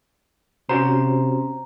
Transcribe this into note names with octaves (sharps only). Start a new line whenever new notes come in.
C3 C#4 F#4 C5 A#5